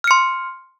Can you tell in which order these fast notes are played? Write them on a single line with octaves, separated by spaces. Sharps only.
F6 C#7 C6